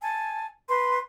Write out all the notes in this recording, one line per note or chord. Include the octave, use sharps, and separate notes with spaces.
G#5 A5
B4 C6